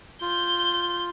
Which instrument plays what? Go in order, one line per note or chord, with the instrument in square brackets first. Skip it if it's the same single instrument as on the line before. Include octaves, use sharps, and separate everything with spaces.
[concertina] F4 [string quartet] G6